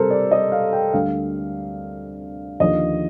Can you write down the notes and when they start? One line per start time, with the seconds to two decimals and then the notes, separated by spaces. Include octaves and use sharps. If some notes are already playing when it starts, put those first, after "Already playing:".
Already playing: C3 G3 A4 A#4 C5
0.11 D5
0.31 D#5
0.52 F5
0.73 G5
0.93 D2 D3 G3 F5
2.60 D#2 D3 F3 D#5